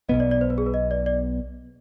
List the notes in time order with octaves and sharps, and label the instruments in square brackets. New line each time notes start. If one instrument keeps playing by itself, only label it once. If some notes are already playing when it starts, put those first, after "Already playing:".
[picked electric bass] B1 B2 B3 [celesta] D#5
[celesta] D5
D5
C5
B4
G#4
B4
D#5
D5
D5